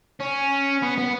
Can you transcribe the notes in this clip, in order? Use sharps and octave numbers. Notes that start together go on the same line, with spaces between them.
C#4
B3
B3